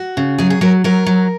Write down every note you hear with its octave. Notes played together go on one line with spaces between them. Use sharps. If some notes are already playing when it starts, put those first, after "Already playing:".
Already playing: F#4
C#3
F#3 G#4
G#4
F#3 A#4
F#3 A#4
F#3